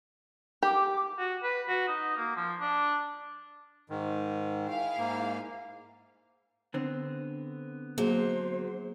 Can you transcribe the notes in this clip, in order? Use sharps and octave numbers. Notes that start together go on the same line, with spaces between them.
G4 D6
F#4
B4
F#4
D#4
A#3
F3
D4
G#2 D#3
E4 G#4 F5
G#2 A#3
D3 B3 C4
F#3 A#3 G#4 C5